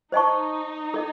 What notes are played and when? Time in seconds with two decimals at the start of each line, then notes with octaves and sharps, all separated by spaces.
0.12 D#4 C5 D#5 A5 C#6
0.94 A4 D#5